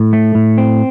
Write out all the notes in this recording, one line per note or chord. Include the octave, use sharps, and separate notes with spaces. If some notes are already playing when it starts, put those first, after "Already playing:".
Already playing: A2
A3
A2
C4